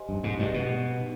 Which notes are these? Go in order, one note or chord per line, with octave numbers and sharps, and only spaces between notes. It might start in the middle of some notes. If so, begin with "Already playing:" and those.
Already playing: G4 C5 D#5 G#5 C6
G2
G#2
G2 G4 B4 D#5
B2
D#4